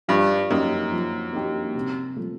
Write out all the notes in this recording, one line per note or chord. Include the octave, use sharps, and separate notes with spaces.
G2 F3
F#2 A#3 D#4 G4
F3
A#3 D#4 G4
C3
F3 A3